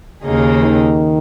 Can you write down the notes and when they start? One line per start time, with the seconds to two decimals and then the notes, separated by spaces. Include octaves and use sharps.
0.23 D#2 C#3 A#3 D#4 G#4
0.62 D#3